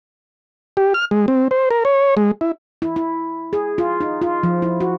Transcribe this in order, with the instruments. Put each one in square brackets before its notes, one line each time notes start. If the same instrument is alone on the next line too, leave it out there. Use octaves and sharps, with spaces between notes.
[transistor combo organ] G4
F6
G#3
C4
C5
A#4
C#5
G#3
E4
[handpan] E4
E4
G#4
F4
D#4
F4
F3
E4
F#4